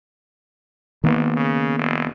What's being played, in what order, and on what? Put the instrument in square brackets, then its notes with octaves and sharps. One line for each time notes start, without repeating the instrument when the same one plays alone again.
[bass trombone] G#1 [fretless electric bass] D#3 A#3 B3
[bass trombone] C#3
F1